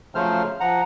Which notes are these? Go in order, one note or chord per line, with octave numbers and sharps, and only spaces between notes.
C#3 F3 F#3 A3 C5 F6
F3 F#5 A#5